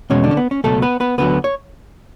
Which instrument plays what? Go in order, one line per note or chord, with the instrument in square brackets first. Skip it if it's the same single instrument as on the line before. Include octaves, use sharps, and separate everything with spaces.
[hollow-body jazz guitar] E2 B2 G#3 C#4 C#5
D3 D4
C#4
B3
C#4
C#2 B2 F#3 A3 A4
B3 B4
B3 B4
D2 D3 F#3 B3 B4
C#5